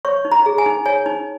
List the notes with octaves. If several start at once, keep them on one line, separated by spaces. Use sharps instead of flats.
C#5 C#6
D#4
A#5
G#4
G#5
D#4
C#5 G#5
D#4